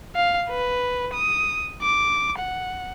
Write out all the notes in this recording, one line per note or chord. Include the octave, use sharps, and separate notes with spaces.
F5
B4
D#6
D6
F#5